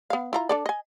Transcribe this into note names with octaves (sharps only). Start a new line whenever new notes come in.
B3 F5
E4 F4 A#5
D4 A4 D5
D#5 G#5